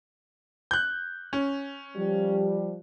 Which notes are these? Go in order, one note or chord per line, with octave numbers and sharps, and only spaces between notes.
F#6 G6
C#4
F3 G3